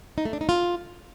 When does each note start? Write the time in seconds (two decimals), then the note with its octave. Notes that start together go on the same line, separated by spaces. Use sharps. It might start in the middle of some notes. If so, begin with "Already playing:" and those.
0.18 D#4
0.25 A3
0.33 D4
0.41 D#4
0.49 F4